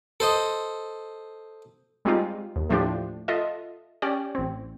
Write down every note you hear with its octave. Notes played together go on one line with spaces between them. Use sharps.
A4 C5 D#5
G3 G#3 C4 D#4 F4 G4
D#2
A2 F3 A3 D4 G4
F4 A4 D#5 E5
C#4 G4 D5
A1 C4